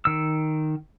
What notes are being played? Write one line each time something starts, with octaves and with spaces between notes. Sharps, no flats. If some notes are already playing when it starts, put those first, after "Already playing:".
D#3 E6